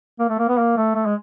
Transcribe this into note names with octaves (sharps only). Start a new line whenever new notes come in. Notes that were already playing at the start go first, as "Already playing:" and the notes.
A#3
A3
A#3
B3
A#3
A3
A3
G#3